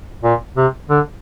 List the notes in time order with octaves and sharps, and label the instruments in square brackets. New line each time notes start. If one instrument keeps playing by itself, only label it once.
[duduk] A#2
C3
D3